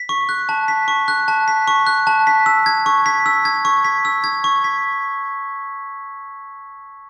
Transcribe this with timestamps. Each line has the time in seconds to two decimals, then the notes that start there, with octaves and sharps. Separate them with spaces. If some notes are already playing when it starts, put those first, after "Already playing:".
Already playing: B6
0.09 C#6
0.29 F#6
0.49 A5
0.68 B6
0.88 C#6
1.08 F#6
1.28 A5
1.48 B6
1.68 C#6
1.87 F#6
2.07 A5
2.27 B6
2.46 E6
2.66 G#6
2.86 C#6
3.06 B6
3.26 E6
3.45 G#6
3.65 C#6
3.85 B6
4.05 E6
4.24 G#6
4.44 C#6
4.64 B6